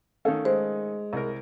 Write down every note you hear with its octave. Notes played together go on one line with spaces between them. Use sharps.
D#3 A3 C#4 A4 F5
G#3 C5
C2 A#4